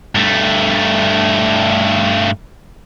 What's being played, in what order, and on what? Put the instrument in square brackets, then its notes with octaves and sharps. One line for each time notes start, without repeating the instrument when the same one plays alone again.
[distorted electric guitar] G2 A3